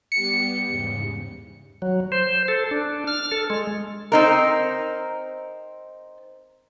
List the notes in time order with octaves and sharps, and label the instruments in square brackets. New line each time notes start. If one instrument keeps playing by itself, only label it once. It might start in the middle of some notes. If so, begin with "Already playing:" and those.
[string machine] G3 B3 G4 [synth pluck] C#7
[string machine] E2 G#2 C#3
[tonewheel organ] F#3
C5
A4
D4
F6
A4
G#3
[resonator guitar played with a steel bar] C4 D#4 A#4